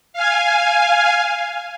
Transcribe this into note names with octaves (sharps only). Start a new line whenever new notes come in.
F5 G#5